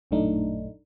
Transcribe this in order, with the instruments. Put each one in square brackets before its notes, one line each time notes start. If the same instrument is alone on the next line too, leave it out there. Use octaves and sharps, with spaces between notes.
[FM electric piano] A1 F#2 A#2 A3 D4 D#4